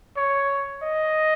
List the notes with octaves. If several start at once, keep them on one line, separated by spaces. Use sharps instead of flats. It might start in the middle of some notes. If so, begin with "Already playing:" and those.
C#5
D#5